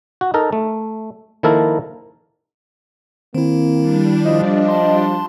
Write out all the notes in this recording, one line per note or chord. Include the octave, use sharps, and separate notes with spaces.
F#4
D#4 A4 A#4
A3
D#3 F3 A#3 E4 A4 A#4
D#3 A#3 C4 E4
G3 D4
F3 D#5
A5 C6